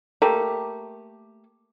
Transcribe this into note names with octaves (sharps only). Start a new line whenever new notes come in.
A3 A#3 G4